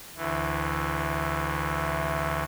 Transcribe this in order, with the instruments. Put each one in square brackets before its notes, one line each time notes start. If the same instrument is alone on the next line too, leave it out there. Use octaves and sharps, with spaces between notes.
[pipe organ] D2 E3